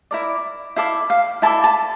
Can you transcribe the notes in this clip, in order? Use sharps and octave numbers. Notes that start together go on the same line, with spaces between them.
E4 A#4 D5
E4 A4 D5 F5
F5
E4 A4 D5 A5
A5